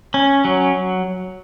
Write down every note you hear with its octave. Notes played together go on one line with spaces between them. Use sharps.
C#4
F#3